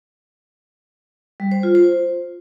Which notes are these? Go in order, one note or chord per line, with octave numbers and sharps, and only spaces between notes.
G3
C5
F4
C5